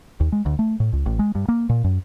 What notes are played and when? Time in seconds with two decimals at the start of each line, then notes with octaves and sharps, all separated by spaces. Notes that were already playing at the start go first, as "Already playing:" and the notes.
0.20 D#2
0.32 G#3
0.46 D2
0.59 A3
0.80 A2
0.93 C#2
1.06 A1
1.19 G#3
1.35 G2
1.48 A#3
1.69 A#2
1.84 F#2